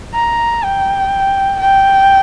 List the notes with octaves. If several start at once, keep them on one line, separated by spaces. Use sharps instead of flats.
A#5
G5
G5